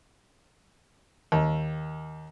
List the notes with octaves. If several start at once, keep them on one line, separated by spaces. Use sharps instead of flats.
D#2